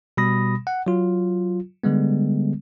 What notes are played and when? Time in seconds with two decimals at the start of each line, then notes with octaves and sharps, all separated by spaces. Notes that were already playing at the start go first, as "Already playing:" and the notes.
0.17 B2 G3 B5 D#6 A#6
0.67 F#5
0.87 F#3 F4
1.84 D3 G3 G#3 B3